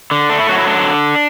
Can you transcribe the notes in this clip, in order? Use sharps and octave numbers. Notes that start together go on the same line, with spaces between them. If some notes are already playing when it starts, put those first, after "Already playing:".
D3
A3 D4
E4
F#3 F#4
E4
D3 D4